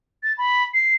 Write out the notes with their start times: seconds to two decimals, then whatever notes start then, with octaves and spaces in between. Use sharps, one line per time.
0.23 A6
0.38 B5
0.74 C7